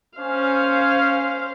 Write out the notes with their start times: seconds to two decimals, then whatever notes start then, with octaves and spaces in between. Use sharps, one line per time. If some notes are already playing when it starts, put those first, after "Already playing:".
0.18 C#4 C5 F5